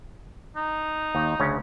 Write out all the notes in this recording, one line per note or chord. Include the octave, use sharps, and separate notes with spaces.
D#4
D#2
D2 C#3 C#4